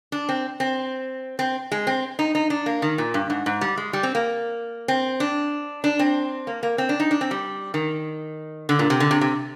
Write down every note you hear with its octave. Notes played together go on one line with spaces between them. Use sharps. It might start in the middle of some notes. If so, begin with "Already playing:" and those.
D4
C4
C4
C4
G#3
C4
D#4
D#4
D4
A#3
D#3
A#2
G2
G#2
G#2
G3
G#3
G3
C4
A#3
C4
D4
D4
C4
A#3
A#3
C4
D4
D#4
D4
C4
G3
D#3
D3
A#2
C3
D3
C3
C3